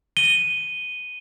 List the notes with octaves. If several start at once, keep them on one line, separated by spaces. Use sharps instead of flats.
D#7 G7